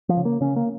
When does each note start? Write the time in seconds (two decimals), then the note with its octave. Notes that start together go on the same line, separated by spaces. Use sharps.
0.09 F3
0.17 C#3
0.25 A#3
0.41 C#3 C#4
0.56 A#3